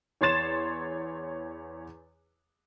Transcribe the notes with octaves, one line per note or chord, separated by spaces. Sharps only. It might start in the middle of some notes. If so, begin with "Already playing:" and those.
E2 C#5 C6 A6 E7